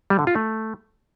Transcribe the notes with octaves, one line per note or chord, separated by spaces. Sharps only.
G3
D3
F4
A3